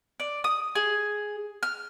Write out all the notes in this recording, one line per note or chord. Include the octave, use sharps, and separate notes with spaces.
D5
D#6
G#4
F6